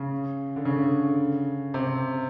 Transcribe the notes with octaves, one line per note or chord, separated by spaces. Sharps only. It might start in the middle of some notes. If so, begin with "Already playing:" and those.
Already playing: C#3
D3
C#3
C3